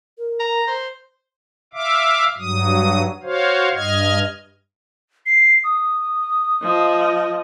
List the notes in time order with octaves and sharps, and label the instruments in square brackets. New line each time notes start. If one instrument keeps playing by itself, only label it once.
[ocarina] A#4
[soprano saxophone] A#5
C5
[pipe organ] E5 F5 D6
G2 F#3 D#6
F#4 C5 C#5 F5
G2 D#5 F6 G#6
[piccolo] C7
D#6
[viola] F3 D#5